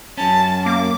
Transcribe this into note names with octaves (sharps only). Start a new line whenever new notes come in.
F#2 C#4 A5
A#3 D6